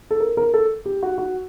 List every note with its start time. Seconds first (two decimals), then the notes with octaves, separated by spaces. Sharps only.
0.11 A4
0.20 A#4
0.37 A#4
0.54 A4
0.86 G4
1.03 F#4
1.18 F#4